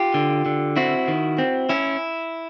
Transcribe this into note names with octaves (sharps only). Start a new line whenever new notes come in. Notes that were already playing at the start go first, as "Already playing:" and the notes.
Already playing: F4 G4
D3
D3
C4 E4 F#4
D#3
C4
C#4 E4